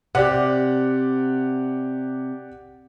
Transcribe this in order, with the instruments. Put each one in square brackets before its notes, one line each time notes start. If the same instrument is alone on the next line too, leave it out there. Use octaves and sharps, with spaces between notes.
[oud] C3 [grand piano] G4 D5 F#5